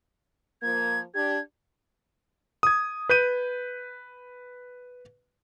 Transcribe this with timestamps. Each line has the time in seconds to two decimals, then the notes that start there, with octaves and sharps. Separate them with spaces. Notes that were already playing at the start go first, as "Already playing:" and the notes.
0.62 F3 A#3 G#6
1.15 D4 G4 G#6
2.63 D#6 G#6
3.09 B4 G6 D#7